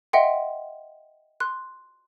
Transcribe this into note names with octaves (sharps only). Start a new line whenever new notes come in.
D#5 E5 F#5 G5 C6
C6 F#6